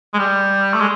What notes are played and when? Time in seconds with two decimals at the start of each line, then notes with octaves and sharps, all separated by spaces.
0.14 G#3
0.19 G3
0.74 A3
0.80 G#3